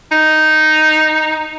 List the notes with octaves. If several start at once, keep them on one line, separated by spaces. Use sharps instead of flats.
D#4